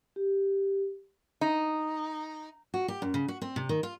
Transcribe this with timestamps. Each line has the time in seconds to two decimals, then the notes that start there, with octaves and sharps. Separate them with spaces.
0.16 G4
1.41 D#4
2.74 F#4
2.88 G4
3.02 F#2
3.14 C#3
3.28 F#4
3.42 C4
3.56 C3
3.69 D#3
3.83 F4